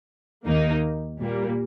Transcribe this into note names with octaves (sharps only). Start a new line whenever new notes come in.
D#2 D#3 A#3 D#4
A#2 G3 A#3